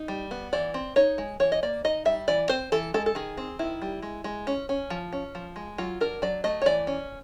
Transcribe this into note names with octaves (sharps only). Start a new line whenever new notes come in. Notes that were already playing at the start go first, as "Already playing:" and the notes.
Already playing: D#4
G3
B3
E3 D5
C4
D#4 C#5
G#3
E3 C#5
D#5
A#3 D5
D#4 D#5
G3 E5
E3 D5
C4 C5
E3 A4
G#3 A4
A4
D#3 G#4
C4
D#3 E4
G3
G#3
G#3
C#4
C#4
F3
C#4
F3
G#3
F#3 F4
D4 A#4
F#3 D5
A3 D#5
C#5
E3 D5
C#4